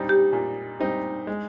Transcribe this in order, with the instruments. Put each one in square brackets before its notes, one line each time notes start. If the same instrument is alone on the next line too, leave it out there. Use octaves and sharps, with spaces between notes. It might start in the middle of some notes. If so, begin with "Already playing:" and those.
Already playing: [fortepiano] A#2 G3 C4 D#4
[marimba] G4
[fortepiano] A#2
G3 C4 D#4
G#3